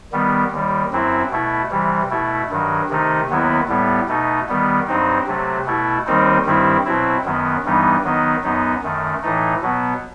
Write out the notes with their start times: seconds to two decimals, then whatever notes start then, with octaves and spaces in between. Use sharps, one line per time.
0.13 D#3 G3 B3
0.52 D#2 D#3 G3
0.91 F#2 F#3 C4 E4
1.31 B2 A3 E4
1.71 C3 E3 G3
2.10 B2 A3 E4
2.50 G2 D#3 F#3
2.89 C3 D#3 A3 D#4
3.30 D#2 D#3 F#3 B3 E4
3.69 A2 G3 B3
4.09 B2 A3 D#4
4.48 D#3 G3 B3
4.87 G2 F#3 C4 D#4
5.27 C3 F#3 A3
5.66 B2 A3 E4
6.07 D#2 D#3 G3 C4 D#4
6.46 G2 D#3 G3 C4 E4
6.85 B2 F#3 C4 E4
7.25 F#2 D#3 F#3 B3
7.64 G2 E3 G3 B3 D#4
8.04 D#3 F#3 B3 D#4
8.43 F#2 F#3 B3 D#4
8.83 F#2 D#3 A3
9.22 A2 E3 A3 D#4
9.62 B2 F#3 B3